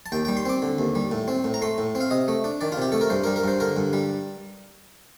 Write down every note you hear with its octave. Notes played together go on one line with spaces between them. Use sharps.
A5
D#2 G5
G3 G5
C6
C4 D6
D3
D#2
G3
A2
C4
A2
A#5
A3 C6
A2
C4
F5
C3 D#5
A3
D4
D#3 D5
F4
C3 G4
A3 A4
A#4
G2 C5
G3 A#4
A#4
G2 C5
D3 A#4
G2
G3